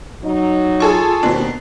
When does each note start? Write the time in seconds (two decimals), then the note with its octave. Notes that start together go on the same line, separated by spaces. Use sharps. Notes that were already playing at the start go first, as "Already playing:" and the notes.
0.24 F#3 D#4
0.80 F4 G#4 A4 C#6
1.23 D#2 B2 C4 D4